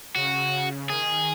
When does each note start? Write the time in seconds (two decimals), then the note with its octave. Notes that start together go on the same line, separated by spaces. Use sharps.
0.16 C#3 F#4
0.90 D#3 G#4